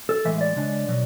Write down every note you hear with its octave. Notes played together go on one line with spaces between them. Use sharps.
A4
A2 E3 G#3 E5
D5
C#3 G#3 D4
B2 F#3